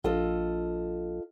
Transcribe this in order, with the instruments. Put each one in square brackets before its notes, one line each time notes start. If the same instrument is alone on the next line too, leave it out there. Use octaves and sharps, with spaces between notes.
[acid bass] A#1 [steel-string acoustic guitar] F4 A4 D#5